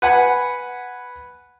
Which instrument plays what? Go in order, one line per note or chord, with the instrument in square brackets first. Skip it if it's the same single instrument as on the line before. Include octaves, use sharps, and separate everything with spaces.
[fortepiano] B4 F#5 G#5 B5